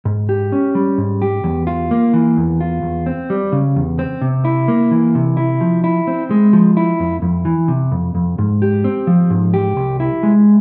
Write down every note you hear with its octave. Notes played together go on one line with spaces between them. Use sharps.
G#2
G4
C#4
G3
G#2
G4
E2
F4
A#3
E3
E2
F4
E2
C4
G3
C#3
E2
C4
C3
E4
A#3
E3
C3
E4
F3
E4
C4
G#3
F3
E4
F2
F2
E3
C3
F2
F2
G#2
G4
C4
F3
G#2
G4
C2
E4
G#3